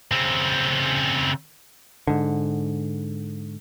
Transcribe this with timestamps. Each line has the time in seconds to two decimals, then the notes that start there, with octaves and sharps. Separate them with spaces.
0.11 C#3 C4
2.07 G#2 D3